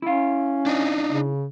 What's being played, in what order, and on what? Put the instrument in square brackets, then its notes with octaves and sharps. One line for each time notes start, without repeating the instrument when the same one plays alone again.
[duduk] C#4 [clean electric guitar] E4 F5
[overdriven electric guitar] D4 D#4
[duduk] C#3